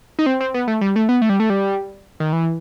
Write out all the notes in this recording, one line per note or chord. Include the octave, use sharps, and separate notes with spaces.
D#4
C4
C4
B3
A3
G3
A3
B3
A3
G3
A3
G3
D#3
E3